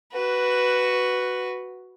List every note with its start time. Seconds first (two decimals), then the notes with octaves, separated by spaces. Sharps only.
0.13 F#4 B4